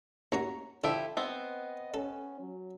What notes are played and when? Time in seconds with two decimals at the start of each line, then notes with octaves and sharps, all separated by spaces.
0.32 D#2 C#4 F#4 A#5
0.84 D3 F3 E4 G4
1.17 B3 C4 D#5
1.94 C#4 A4
2.40 F#3